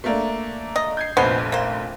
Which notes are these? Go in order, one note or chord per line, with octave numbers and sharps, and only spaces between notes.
A3 A#3 D4
D#5
G6 G#6 C7
F1 A#1 B2 B3 C5
A#3 C5